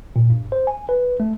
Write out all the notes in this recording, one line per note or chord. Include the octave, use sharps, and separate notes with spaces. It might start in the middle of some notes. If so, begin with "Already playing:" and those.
A#2
G2
C5
G#5
B4
A3